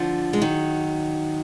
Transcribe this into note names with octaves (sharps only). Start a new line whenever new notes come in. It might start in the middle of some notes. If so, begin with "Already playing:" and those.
Already playing: D3 F3
G#3
D#3 F#3